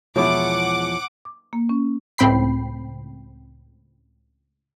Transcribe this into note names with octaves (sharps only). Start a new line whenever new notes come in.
E2 B2 F3 G#3 E4 C#5 F#5 D6
D6
A#3
C#4
C#2 A2 C4 G5 B5 C7